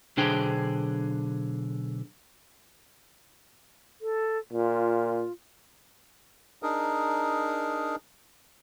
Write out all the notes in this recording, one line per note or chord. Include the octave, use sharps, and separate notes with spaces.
B1 D3 D4 G#4 C5 G5
A4
A#2 F4
D4 D#4 G#4 A#4